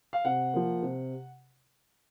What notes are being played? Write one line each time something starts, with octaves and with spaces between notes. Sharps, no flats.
F5
C3 F#5
F3 A#3
C3